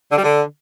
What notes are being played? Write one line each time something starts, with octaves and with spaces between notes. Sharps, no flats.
D3
G3
D3